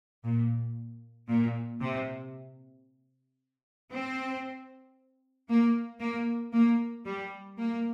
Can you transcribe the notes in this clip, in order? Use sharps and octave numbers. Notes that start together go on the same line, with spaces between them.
A#2
A#2
C3
C4
A#3
A#3
A#3
G3
A#3